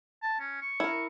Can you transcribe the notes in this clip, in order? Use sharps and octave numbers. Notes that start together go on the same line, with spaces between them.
A5
C#4
C#6
E4 A#4